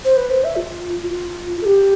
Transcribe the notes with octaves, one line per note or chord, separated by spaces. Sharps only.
C5
B4
C5
E5
F4
F4
A4
G4